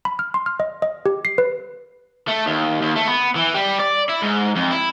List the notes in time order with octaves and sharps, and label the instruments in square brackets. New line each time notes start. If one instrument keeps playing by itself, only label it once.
[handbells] B5
F6
C6
F6
D#5
D#5
G4
C7
B4
[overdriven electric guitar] A3
D#2
D#2
A3
B3
E3
G3
D5
E4
G#2
F2
E4